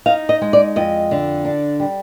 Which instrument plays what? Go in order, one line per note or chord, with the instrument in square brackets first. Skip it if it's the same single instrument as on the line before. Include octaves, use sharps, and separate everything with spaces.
[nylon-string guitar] D#4 F5
D#5
G#3
D5
F2 D#5
D3
D4
G3